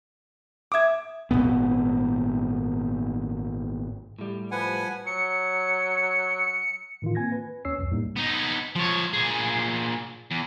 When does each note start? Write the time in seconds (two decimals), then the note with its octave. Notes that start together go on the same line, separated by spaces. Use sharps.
0.72 E5 D6 D#6 G#6
1.31 G#1 E2 A#2 B3
4.19 A2 G3
4.51 F3 B4 F#5 G#5
5.06 F#3 C#7
7.02 A2 D#3 E3 F4
7.15 A#3 C4 G#5 G#6 A#6
7.32 B4
7.65 D#2 C#4 C#5 E6 C7
7.78 C2 F2
7.91 A2 G3 A#3 D#4
8.16 B3 D#4
8.76 F3 C#5
9.13 A#2 G#4
10.31 E2